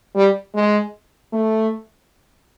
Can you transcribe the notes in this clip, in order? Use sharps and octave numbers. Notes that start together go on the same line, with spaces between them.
G3
G#3
A3